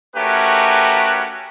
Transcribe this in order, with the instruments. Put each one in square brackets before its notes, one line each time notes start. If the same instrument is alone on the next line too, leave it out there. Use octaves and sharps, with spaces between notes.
[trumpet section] A3 C#4 F#4 G4 A#4 B4